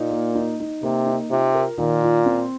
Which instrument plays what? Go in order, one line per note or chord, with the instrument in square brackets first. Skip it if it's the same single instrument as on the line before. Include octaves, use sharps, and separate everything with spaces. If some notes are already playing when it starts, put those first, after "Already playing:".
Already playing: [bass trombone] A#2 [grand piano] D#4
[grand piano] A#3
D#4
D#4
[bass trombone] C3 [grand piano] A#3
[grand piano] D#4
[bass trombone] C3 [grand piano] F4
[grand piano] A#4
[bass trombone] A#2 [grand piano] D#3
[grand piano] F4
C4